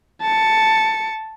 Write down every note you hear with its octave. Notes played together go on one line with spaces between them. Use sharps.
A5 C#7